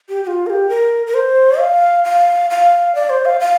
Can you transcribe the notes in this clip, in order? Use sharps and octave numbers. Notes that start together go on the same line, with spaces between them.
G4
G4
F4
A#4
G4
A#4
A#4
C5
F5
F5
F5
D5
C5
F5
F5